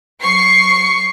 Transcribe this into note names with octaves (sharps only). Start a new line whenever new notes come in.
F#3 C#6 C7